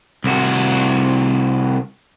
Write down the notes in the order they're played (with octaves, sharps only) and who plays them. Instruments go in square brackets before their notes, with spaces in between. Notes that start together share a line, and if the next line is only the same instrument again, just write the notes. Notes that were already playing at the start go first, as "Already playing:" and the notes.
[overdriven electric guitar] C2 F#4